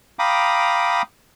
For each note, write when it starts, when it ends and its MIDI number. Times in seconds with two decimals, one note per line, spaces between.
0.19 1.02 77
0.19 1.02 79
0.19 1.02 82
0.19 1.02 83
0.19 1.02 86
0.19 1.02 87